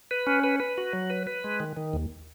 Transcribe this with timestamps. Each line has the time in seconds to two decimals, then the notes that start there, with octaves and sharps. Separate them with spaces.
0.11 B4
0.27 C#4
0.44 B4
0.60 B4
0.78 F#4
0.93 F#3
1.10 B4
1.27 B4
1.44 G#3
1.60 D#3
1.77 D#3
1.93 D#2